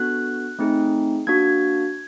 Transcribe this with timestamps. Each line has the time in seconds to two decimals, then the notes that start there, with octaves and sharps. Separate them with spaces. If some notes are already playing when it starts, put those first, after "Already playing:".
Already playing: B3 D4 F#4 A4 F#6
0.59 A3 C4 D#4 G#4
1.27 A#3 D4 F#4 G#6